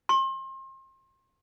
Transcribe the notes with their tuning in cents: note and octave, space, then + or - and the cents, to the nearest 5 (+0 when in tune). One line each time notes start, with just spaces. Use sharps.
C6 +35